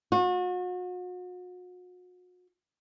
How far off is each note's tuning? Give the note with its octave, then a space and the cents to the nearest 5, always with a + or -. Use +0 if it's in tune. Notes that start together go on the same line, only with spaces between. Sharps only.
F#4 -40